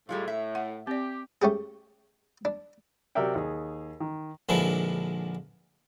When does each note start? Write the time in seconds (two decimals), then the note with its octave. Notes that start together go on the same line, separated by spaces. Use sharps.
0.09 A2 G3 G#3 F4
0.28 E5
0.55 F#5
0.87 C4 G4 D5
1.42 A3 C#4 G4 G#4
2.45 D4
3.15 C3 F#3 A#4 D5 E5 G5
3.35 D#2 G#4
4.00 D#3
4.49 A#1 D3 F3 G#3 E4 B4